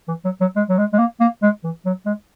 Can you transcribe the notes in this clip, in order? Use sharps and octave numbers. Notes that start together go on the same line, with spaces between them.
E3
F#3
F#3
G#3
F#3
G#3
G#3
A#3
A#3
G#3
E3
F#3
G#3